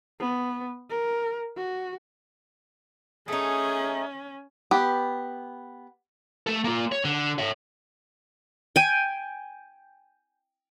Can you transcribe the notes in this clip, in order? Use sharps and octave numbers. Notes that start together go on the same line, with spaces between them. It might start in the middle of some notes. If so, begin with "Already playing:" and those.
B3
A#4
F#4
A3 C#4 D#4 G#4
B3 G4
A3 A4
A#3 F4
C#5
D3
C#5 E5
G5 G#5